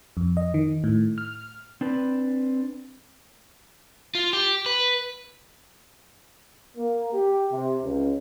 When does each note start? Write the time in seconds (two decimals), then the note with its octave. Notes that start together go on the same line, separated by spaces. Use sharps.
0.17 F2
0.37 D#5
0.54 D#3
0.84 A2
1.18 F6
1.81 C4 D4 B4
4.15 F4
4.33 G4
4.66 B4
6.77 A#3
7.13 G4
7.52 C3
7.83 C#2